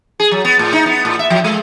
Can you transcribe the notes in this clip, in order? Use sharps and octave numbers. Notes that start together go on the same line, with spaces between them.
G#4
F#3
B3
A2
D#4
B3
A2
E5
F3
G#3